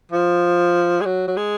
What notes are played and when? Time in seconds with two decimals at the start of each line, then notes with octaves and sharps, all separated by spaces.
0.12 F3
1.01 G#3
1.06 F#3
1.27 F#3
1.37 G#3